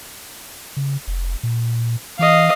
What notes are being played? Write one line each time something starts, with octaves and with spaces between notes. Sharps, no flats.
C#3
F1
A#2
E3 D#5 F5